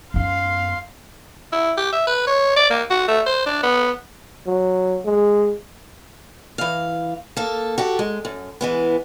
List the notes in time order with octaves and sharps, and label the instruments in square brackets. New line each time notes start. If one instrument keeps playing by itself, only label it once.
[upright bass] F#2 B3 [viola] F5 C6
[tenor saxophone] E4
G4
E5
B4
C#5
D5
A#3
F#4
A3
C5
D4
B3
[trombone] F#3
G#3
[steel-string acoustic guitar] E3 F5
A#3 A4
F#4 G4 A4
G#3
F#2
E3 G#3 B3